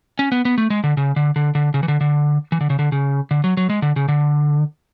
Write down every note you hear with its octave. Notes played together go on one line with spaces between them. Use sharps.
C#4
B3
B3
A3
G#3
D3
C#3
D3
D3
D3
C#3
E3
D3
D3
E3
D3
C#3
D3
C#3
D3
F#3
F#3
G#3
D3
C#3
D3